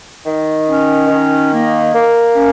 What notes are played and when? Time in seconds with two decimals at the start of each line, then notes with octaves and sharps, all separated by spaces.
0.25 D#3
0.67 C#4
1.08 D#3
1.51 A#3
1.94 A#3
2.35 C#4